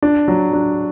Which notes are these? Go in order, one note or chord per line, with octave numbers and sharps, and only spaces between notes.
D4
F#3
D4